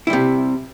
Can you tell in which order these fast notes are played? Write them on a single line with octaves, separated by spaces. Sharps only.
E4 G3 C3